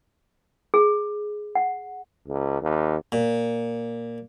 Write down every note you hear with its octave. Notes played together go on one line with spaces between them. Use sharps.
G#4
F#5
C#2
D#2
A#2